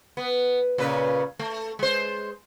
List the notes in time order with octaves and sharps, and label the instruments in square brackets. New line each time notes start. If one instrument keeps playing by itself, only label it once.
[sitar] B3
A#2 C#3 B4
A3
G#3 C5